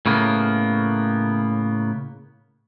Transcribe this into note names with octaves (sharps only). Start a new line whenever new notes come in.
A2 C#3 A#3 B3